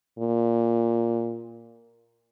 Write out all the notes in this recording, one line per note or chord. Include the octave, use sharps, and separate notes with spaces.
A#2